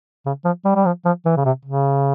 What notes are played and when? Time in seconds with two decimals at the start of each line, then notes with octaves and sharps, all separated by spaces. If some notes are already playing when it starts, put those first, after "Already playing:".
0.26 C#3
0.45 F3
0.65 G3
0.76 G3
0.85 F3
1.05 F3
1.26 E3
1.37 C#3
1.45 C3
1.65 C#3